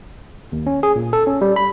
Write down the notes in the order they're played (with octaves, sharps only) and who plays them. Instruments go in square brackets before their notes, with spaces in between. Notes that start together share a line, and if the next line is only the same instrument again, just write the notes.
[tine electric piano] D#2
C#4
G#4
A#2
A4
C#4
G3
B5